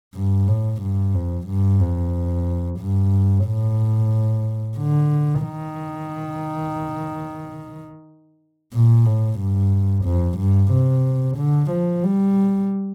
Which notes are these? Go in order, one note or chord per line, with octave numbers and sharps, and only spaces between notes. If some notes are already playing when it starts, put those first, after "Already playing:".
G2
A2
G2
F2
G2
F2
G2
A2
D3
D#3
A#2
A2
G2
F2
G2
C3
D3
F3
G3